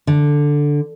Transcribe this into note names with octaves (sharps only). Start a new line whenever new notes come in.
D3